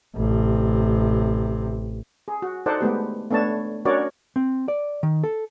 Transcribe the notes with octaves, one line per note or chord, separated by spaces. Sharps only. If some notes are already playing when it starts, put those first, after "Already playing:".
A1 C3
G#4
F#4
D#4 A4 C5 D5 F#5
G#3 A3 B3 G4
A3 B3 D4 C#5 A5
C#4 D4 F#4 A#4 C#5 D5
C4
D5
D#3
A4